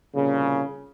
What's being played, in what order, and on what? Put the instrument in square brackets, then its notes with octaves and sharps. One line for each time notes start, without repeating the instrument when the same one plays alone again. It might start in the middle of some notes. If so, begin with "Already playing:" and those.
[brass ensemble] C2 A#2 C#3